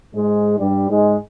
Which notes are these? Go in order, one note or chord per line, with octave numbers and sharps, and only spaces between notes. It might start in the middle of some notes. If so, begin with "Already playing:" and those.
G#2 G#3
G2 G3
G#2 G#3